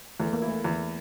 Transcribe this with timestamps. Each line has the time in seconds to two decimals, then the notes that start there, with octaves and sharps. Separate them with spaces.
0.20 E2 A3
0.33 A#3
0.42 E4
0.48 A3
0.65 E2